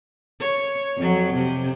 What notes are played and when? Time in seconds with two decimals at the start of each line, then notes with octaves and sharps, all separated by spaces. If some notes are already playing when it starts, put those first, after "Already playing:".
0.40 C#5
0.96 F2 F#3
1.34 C3